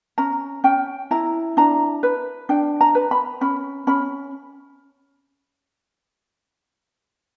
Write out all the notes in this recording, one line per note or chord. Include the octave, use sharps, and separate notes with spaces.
C#4 A#5
C#4 G5
E4 A#5
D4 A#5
B4
D4 G5
A#5
B4
B5
C#4 B5
C#4 B5